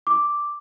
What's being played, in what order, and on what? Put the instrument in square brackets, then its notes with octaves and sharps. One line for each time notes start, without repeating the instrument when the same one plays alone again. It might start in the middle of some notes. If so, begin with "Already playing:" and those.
[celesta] D6